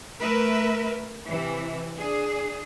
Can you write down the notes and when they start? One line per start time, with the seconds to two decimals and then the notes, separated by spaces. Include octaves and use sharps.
0.20 A3 A#4 B4 E5
1.29 C3 E3
1.97 D4 G#4